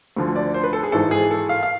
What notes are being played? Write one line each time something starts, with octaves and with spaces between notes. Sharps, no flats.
D2 D3 F3
D5
C5
B4
A4
G#4
G#1 G#2 E3 A4
G#4
A4
F5
F5